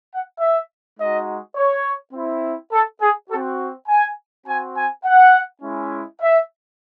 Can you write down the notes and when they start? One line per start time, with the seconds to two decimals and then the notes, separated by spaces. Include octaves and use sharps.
0.11 F#5
0.40 E5
0.99 G#3 D#4 F#4 D#5
1.56 C#5
2.14 C4 E4
2.72 A4
3.01 G#4
3.30 F#4 A4
3.35 C4
3.88 G#5
4.46 C4 F#4 G#5
4.76 G#5
5.05 F#5
5.62 G#3 C#4 E4
6.21 E5